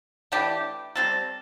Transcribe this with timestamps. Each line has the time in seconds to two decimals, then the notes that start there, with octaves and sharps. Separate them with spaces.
0.32 E3 A3 D4 G4
0.96 G3 C4 A4